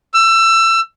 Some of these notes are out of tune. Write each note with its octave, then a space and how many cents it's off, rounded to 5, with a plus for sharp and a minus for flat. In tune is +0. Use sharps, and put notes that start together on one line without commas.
E6 +25